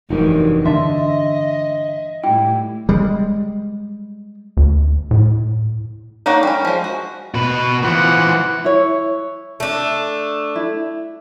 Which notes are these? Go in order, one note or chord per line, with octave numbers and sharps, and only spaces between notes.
F1 G2 E3 D#4 F#4 A#4
D3 D4 D#5 E5 C6
A2 G3 E4 G5
G3 G#3
D2
A2
A#3 D4 D#4 C#5 F#5
G3 C#4
F3 G#3
F#4
B2 B4
E3 F3 F#5
E4 C#5
A3 D4
E4